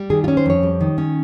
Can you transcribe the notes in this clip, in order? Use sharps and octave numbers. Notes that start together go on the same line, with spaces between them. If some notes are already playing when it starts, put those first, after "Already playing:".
Already playing: G3
D#3 G#4
F4
C#4
C5
F2 C#5
G3
D#3
C#4